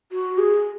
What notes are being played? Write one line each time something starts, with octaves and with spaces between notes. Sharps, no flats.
F#4
G#4